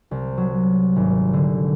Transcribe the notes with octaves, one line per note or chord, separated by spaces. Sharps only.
C2
F#3
G#1
D3